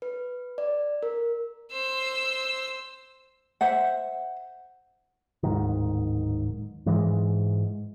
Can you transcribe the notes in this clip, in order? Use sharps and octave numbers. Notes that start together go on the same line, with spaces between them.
B4
D5
A#4
C5 E6
C5 E5 F#5
D1 G#2 D#3
G#2 E3 G#3